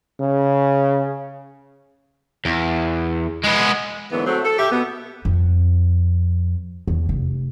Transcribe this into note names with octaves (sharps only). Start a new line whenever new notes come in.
C#3
E2
G#3 B3
G#2 D3 E3 F#3 A#3 B3
F#3 A3 C4
A4
G4 E5
B2 B3
F2
E2
F1